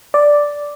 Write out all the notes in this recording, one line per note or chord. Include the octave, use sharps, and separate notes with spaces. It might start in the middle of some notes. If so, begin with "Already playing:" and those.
D5